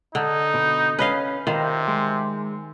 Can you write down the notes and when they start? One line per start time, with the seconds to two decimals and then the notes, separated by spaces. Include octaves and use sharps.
0.15 D3 D#4
0.54 B2
0.99 C#4 B4 D#5 F5
1.47 C3 D#3 D#4 F4
1.88 G#3